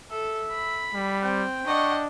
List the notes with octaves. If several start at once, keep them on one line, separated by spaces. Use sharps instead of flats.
A4 E5
B5
G3
C4 G5
D4 D#5 F#5 C#6